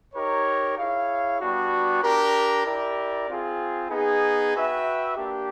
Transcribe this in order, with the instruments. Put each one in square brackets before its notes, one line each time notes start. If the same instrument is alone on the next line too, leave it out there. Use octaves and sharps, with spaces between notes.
[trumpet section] D#4 G4 A#4 C#5
E4 G#4 C#5 F5
G3 B3 D4 F#4
D4 G4 A#4
E4 G4 A#4 D5
C4 F4 G#4
B3 D#4 G#4
F#4 B4 E5 G5
A#3 D4 G4